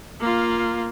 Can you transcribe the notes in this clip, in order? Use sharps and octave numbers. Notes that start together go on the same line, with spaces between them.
A#3 F4